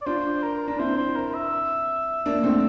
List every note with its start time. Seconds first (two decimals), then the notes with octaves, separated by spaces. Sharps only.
0.02 D5
0.06 D4 F4 C5
0.43 A#4
0.68 D4 A#4
0.79 C4 E4 C5
0.98 C5
1.16 A#4
1.34 E5
2.26 A#3 D4
2.43 A3 C4